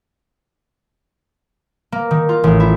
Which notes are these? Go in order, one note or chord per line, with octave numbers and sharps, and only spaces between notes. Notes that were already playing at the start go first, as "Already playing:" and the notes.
A#3
D#3
F4
A1
E4